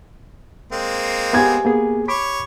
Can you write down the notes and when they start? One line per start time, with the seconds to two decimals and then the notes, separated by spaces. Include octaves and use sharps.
0.72 G#3 A#3 C4
1.33 B3 G4 G#5 G#6
1.65 A#3 B3 G#4
2.08 C#5 B5 D6